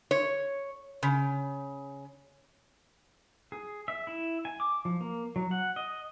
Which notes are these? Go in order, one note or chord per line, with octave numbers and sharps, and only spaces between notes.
C#5
C#3
G#4
E5
E4
G#5
D6
F3
A#3
F#3
F#5
D#5